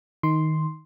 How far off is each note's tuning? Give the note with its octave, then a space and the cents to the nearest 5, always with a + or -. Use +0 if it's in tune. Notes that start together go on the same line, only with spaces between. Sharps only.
D#3 +5 D#4 +15 C6 +0